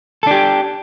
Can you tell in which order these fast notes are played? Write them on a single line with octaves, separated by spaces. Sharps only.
A4 D4 G4